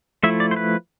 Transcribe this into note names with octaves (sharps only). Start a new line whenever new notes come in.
F3 A3 E4 E5
D5
C5
B4